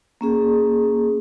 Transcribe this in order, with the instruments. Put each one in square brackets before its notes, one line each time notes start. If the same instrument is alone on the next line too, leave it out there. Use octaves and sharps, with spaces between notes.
[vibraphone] A#3 C#4 G#4